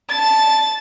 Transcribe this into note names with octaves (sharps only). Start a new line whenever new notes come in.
A5 A6